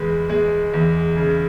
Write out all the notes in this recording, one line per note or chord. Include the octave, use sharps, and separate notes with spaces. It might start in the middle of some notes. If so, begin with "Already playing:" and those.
Already playing: E2 G#3 B4
G#3
E2
C#3